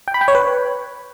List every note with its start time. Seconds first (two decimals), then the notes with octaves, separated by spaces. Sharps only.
0.08 G5
0.14 B5
0.21 G5
0.28 C#5
0.35 B4